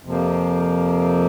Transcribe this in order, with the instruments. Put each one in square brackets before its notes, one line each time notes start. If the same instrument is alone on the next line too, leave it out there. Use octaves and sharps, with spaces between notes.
[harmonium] F2 C3 F3 A#3